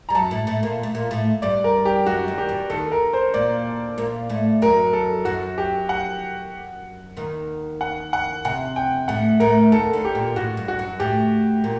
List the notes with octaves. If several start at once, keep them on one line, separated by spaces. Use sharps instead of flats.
G3 A#5
F#2 F#3 A5
A2 A3
A2 A3
A#2 A#3
A3
A#2 A#3
A2 A3
G2 G3 D5
A#4
G4
F#2 F#3 F#4
D#2 D#3
G4
G2 G3
D#2 D#3 A4
A#4
C5
A#2 A#3 D5
A#2 A#3
A2 A3
F#2 F#3 A#4
A4
F#2 F#3 F#4
G4
F#5
D#2 D#3
F#5
F#5
C3 F#5
G5
A2 A3 F#5
A2 A3 A#4
D#2 D#3 A4
D2 D3
G4
A#2
A2 F#4
G2
F#4
F#2 F#3
A2 A3 G4
A#2 A#3